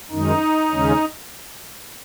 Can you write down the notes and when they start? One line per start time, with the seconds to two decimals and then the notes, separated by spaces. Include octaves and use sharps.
0.10 F#2 D#3 G#3 D#4
0.70 D#2 C#3 G#3 C#4